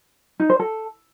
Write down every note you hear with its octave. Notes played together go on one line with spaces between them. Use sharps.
D#4
C5
A4